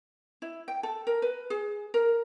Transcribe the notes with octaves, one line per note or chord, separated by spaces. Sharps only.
E4
G5
A4
A#4
B4
G#4
A#4